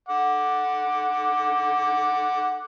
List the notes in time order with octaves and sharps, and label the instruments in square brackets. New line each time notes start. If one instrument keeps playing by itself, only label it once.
[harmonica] F#5 D6